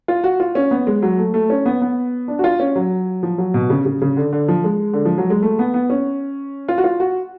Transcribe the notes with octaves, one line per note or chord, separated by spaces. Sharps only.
F4
F#4
F4
C#4
B3
G#3
F#3
A3
A3
C#4
B3
B3
D4
F#4
F4
C#4
F#3
F3
F#3
B2
C#3
C#3
C#3
D3
D3
F3
G#3
D3
F3
F#3
G#3
A3
B3
B3
C#4
F4
F#4
F4
F#4